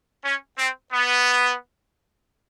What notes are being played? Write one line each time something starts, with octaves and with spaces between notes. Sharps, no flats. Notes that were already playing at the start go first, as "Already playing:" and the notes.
C#4
C4
B3